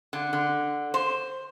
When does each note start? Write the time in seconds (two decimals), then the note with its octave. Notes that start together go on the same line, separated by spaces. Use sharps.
0.13 D3
0.33 D3
0.94 C5